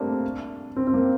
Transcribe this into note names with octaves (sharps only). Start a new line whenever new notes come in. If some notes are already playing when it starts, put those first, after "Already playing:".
Already playing: G3 A3 A#3 C4 D4
C4
C4
A#3